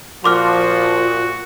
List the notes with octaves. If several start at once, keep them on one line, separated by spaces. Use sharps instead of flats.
A#2 F3 F#4 C6 D6 F6